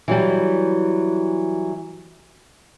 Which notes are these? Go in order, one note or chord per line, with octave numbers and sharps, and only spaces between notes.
E3 F#3 G3